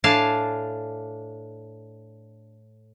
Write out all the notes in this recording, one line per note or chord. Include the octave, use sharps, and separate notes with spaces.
A2 D4 F5 G#5 A5